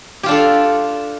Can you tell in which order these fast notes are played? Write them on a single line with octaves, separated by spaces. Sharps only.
G4 F4 D4 A4 F5